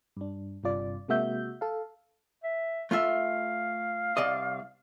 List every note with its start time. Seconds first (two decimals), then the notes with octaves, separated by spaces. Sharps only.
0.17 G2 D4
0.63 G1 G2 C3 F4 D5
1.08 C3 G#3 A#3 F#4 E5 G6
1.61 A4 F5
2.44 E5
2.91 A3 F4 E5 F5
4.17 C2 D5 D#5